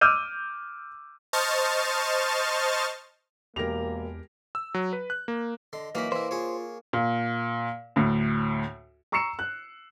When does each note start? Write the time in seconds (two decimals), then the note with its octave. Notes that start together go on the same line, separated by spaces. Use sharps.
0.01 D6 E6 F6 G6 D#7
1.33 C5 D#5 A5 C#6 F6 A6
3.56 E1 E2 A#3 G4 A#4 A#6 F7
4.55 E6
4.74 F#3
4.93 B4
5.10 F#6
5.28 A#3
5.73 D3 D#5 C6
5.95 E3 F#3 A#3 D#4 B5
6.12 E3 E4 C5
6.31 F4 G#4 C#5
6.93 A#2
7.96 D2 A2
9.12 A#5 C#6 E6 C7 C#7 E7
9.39 F#6